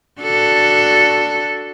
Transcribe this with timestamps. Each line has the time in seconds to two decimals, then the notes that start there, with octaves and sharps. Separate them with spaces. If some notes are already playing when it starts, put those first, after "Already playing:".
0.22 D4 F#4 A4